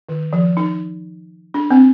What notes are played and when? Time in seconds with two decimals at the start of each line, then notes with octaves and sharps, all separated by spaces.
0.09 D#3
0.33 F3
0.57 D#4
1.54 D4
1.71 C4